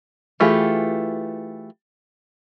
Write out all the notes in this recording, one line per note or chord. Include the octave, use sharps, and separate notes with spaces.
E3 A3 F4 G4 G#4